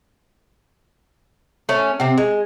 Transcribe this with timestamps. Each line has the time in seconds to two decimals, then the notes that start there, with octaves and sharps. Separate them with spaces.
1.69 A3 C#4
2.00 C3 C4
2.18 G#3